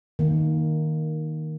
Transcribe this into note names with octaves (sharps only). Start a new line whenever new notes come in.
D#3 A#3